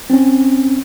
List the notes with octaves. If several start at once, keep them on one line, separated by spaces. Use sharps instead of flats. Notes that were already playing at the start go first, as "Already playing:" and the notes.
C4 C#4